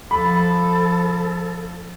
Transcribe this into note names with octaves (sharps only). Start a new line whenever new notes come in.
F3 A4 B5